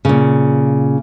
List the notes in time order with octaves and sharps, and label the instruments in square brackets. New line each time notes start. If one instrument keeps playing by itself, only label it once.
[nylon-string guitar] A#2 C#3